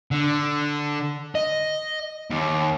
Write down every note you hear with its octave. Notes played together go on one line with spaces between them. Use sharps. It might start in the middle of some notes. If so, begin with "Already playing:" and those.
D3
D#5
D#2